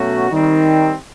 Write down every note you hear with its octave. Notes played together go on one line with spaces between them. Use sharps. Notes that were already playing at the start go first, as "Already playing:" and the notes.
Already playing: B2 F#3 A3 C#4 F#4
D#3 G3 C4